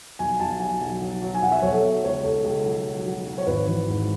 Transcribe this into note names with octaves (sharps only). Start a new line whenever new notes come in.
B1 G#5
B1 A5
F#3 G#5
B1
F#3
F#3
G#5
B1 F#5
E5
B1 C#5
A4
B2
C#2 C#5
C#2 A4
C#2 A4
F#3
F#3
F#3
F#3
C#5
G#1 B4
E3
G#2